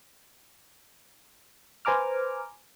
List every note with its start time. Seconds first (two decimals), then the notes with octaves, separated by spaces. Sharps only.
1.85 B4 C5 G#5 A#5 D6 F6